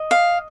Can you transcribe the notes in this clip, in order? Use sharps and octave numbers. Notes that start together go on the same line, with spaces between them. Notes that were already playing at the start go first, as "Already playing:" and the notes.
Already playing: D#5
F5